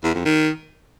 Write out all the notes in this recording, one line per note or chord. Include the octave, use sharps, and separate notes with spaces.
E2
F2
D#3